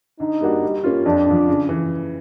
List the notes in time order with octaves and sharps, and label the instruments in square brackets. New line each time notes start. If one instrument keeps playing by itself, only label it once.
[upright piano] D3 [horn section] D#4
[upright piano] G3 A#3 D4 F#4
G3
A#3 C#4 F4
[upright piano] F2 [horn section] D4
[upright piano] D3 F3
C#3
E3